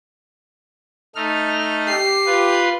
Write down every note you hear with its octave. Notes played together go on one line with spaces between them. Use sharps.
A3 D#4 F6
G4 C7
F4 B4